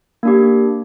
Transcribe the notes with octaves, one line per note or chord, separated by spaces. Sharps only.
A#3 D4 G4